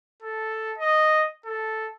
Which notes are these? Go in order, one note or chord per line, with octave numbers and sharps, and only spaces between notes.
A4
D#5
A4